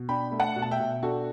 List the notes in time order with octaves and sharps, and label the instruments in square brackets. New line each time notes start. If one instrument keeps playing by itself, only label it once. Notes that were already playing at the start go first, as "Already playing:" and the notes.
Already playing: [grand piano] B2
D4 G5 B5
A3
F#5 A5
B2
A5
E5 G5
B2
D4 F#4 A4